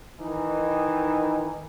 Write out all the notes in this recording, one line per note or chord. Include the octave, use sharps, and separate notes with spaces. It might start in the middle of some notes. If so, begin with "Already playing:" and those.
D#3 E3 D#4